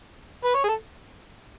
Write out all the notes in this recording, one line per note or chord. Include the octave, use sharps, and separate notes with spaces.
B4
C#5
G#4
A4